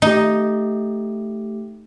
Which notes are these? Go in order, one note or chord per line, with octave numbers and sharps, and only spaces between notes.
A3 D#4 G4